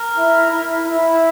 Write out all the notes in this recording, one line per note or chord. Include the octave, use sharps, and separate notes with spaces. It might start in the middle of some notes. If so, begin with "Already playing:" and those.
Already playing: A#4
E4
E4
E4